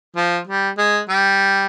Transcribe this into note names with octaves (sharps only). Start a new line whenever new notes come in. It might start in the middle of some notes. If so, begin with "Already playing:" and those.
F3
G3
G#3
G3